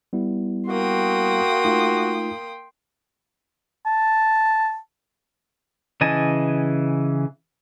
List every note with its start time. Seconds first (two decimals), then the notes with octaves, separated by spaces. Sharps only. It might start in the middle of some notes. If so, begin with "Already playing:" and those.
0.13 G3 B3 E4
0.70 A#3 F#4 G5 C6 D#6
1.65 A3 D#4 F4
3.86 A5
6.01 C#3 E3 D#5 G#5 A5